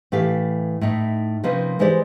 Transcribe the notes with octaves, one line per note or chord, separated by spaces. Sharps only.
A2 E3 G4 A4 F5
A2 D#4 E4
C3 F3 A#3 C#4 D#4 B4
E3 G#3 G4 C5 D5